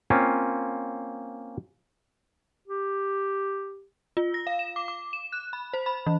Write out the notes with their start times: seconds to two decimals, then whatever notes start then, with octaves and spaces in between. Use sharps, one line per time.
0.10 A#3 C4 C#4 F4
2.68 G4
4.17 F4
4.34 A#6
4.47 F5
4.59 E7
4.76 D6
4.88 D6
5.13 E7
5.32 F#6
5.53 B5
5.73 C5
5.86 B5
6.06 E3